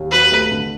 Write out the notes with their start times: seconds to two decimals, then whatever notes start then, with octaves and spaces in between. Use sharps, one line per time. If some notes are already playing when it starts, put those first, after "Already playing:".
Already playing: D#2
0.12 F#3 B4
0.32 A3
0.51 D3